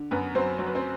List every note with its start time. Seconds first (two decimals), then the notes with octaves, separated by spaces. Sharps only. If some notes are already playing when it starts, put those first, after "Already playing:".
Already playing: D3
0.11 F#2 B3 B4
0.35 F#3 C4 C5
0.58 F#3 C5
0.67 B4
0.75 C4 C5